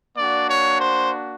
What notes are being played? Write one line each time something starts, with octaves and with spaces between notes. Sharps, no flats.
A#3 D4 F#4 D5
C#5
C5